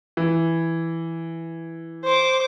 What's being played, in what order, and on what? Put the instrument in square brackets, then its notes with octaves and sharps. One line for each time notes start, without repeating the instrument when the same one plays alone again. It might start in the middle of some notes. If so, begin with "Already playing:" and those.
[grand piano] E3
[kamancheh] C5 D6